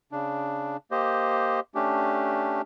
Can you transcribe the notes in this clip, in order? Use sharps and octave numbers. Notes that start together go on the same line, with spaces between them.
C#3 D4
A#3 G4 C5 D#5
A3 C#4 D4 G4